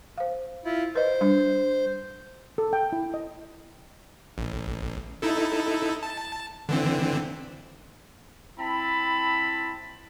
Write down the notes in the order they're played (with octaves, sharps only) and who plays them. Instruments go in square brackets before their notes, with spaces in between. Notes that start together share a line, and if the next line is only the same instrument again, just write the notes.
[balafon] C5 F5
[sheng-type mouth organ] E4 F4
[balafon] B4 D#5 [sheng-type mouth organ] C5
[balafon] G3 D4
[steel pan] A4
G5
E4
D#5
[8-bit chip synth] A1
D#4 E4 A4
A5
D3 E3 C4
[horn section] C4 E4 A5 B5